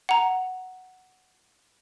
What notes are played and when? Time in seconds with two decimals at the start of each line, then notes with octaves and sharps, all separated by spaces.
0.09 F#5 A#5